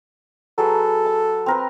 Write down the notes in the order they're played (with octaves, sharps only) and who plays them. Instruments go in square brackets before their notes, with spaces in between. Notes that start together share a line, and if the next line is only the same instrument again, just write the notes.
[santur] F#3 G#4 B4 [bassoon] A4
[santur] A5
C4 A#4 B4